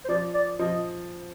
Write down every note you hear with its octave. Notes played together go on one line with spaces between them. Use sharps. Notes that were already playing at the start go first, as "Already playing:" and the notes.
C5
F3 D5
D5
F3 D#5